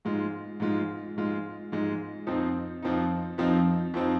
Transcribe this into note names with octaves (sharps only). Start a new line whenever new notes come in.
G#2 G#3 F4
G#2 G#3 F4
G#2 G#3 F4
G#2 G#3 F4
F2 F3 C4 D#4
F2 F3 C4 D#4
F2 F3 C4 D#4
F2 F3 C4 D#4